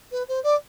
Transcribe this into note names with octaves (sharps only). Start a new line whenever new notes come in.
B4
C5
D5